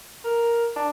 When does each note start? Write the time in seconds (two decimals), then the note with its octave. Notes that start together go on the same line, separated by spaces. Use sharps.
0.24 A#4
0.76 D4